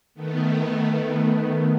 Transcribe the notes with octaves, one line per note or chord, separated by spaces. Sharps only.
D#3 A3 B3